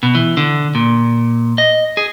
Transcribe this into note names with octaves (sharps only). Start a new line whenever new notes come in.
B2
E3
D3
A#2
D#5
G#4